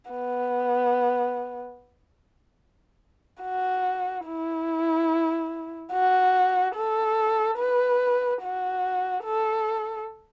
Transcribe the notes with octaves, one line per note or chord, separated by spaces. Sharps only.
B3
F#4
E4
F#4
A4
B4
F#4
A4